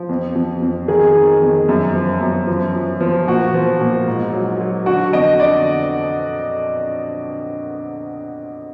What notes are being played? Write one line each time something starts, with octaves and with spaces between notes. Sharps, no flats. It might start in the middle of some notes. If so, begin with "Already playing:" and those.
Already playing: F3
F2
F2
F2
D#3 G#4
D#3
F2
F#2
F3
F#2
F3
F3
F3
A#2 F#4
F3
A#2
G#2
F#3
F#3
D3 F#4
F2 D#5
D3 D5